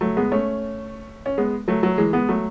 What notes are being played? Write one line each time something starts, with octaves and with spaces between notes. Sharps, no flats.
F#3 A3
G#3 B3
A3 C#4
C#4
G#3 B3
F#3 A3
F#3 A3
E3 G#3
G#3 B3
F#3 A3